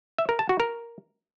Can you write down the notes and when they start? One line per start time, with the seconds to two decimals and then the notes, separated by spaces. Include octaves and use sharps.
0.18 E5
0.29 A#4
0.39 A5
0.49 F#4
0.60 A#4